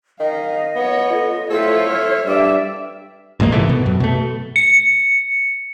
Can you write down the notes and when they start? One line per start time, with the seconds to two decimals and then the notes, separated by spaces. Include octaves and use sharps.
0.20 D#3 D#5 F5
0.76 B3 C#5
1.14 F4 A4
1.50 A2 F4 A4 C5 C#5 E5
1.87 C5 E5 F6
2.27 G2 D5 E5 D6
3.40 A1 A#2 G#3 A#3
3.52 G#2 C3 E3 A3
3.69 B2
3.86 F#2
4.00 B2 A3
4.56 C#7